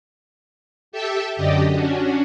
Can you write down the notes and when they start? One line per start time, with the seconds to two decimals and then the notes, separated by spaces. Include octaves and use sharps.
0.92 G4 A4 E5 A5
1.36 F#2 D3 D4 G4 D#5
1.74 C#4 D4 F#4